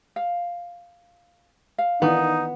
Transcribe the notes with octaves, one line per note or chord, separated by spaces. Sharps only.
F5
F5
D#3 E3 B3 D4 D#4